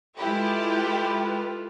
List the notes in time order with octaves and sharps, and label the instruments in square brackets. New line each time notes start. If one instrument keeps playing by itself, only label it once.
[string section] G#3 E4 G4 [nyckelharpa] F4 A4 [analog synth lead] B4